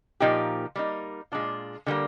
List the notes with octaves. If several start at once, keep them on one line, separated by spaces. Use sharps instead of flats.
A#2 F3 A#3 D#4 G4
G3 A#3 D#4
A#2 G#3 D4 F4
D3 G3 A#3